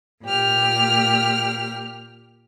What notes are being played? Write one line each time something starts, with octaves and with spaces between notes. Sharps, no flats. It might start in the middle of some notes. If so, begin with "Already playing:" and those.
A#2 G4 F6